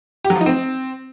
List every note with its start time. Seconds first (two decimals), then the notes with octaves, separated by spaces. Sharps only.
0.25 G4
0.30 F#3
0.35 F3
0.41 D#4
0.46 C4